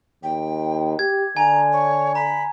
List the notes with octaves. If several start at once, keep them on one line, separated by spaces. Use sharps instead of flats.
D#2 G5
G4 G#6
D3 G#5 A#5
C#5
A#5 B5